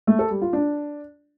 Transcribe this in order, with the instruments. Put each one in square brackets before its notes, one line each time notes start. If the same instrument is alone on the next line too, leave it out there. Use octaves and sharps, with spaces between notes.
[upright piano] A3
A4
G3
F4
D4